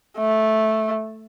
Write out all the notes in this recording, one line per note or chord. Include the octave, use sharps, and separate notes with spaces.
A3